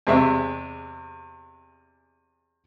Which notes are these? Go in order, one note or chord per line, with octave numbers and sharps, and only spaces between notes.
E2 C3 G#3 C4 E5 C#6